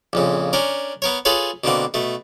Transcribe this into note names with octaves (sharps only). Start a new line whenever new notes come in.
A#1 F2 C#3
C#4 D4 A#4
B3 A#4 C#5
F4 G#4 A4 B4 C#5
B2 D3 A#3 C4
B2 A3